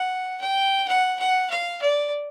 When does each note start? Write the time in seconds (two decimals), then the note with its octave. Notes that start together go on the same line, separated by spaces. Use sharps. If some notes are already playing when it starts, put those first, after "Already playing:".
Already playing: F#5
0.41 G5
0.88 F#5
1.19 F#5
1.50 F5
1.82 D5